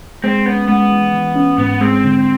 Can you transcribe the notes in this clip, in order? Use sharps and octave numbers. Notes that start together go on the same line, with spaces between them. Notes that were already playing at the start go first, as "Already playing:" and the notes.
G#3 C4
B3 C#4
G#3 B3
E3
E3
C#4
G#2 B3
G#3 C4
D3